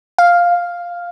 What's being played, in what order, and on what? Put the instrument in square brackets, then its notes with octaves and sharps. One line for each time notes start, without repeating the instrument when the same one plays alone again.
[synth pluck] F5